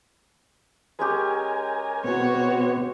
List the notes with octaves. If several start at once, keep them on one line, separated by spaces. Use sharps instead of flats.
G#3 C#4 G4 A#4 G#5
B2 B3 C4 F#4 C#5